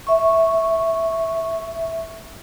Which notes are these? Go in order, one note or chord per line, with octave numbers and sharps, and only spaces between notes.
E5 C#6